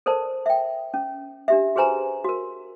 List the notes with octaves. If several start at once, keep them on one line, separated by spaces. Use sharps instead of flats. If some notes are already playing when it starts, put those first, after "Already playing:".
A4 A#4 C5 D5 A5
E5 G5
C#4
D4 G4 E5
F#4 G#4 B4 C5 G#5 A#5
F#4 A#4